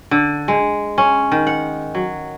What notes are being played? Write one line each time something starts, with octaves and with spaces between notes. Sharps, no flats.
D3
G#3
C#4
D#3
F#5
F#3